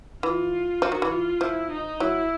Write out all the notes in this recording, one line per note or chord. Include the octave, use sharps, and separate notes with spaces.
E3 F4
F3 F#4
D#3
E3
F4
F3 E4
D#4
F#3 E4